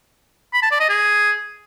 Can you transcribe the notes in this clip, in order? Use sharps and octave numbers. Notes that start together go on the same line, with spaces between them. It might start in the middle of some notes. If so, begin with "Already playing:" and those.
B5
A5
D5
D#5
G#4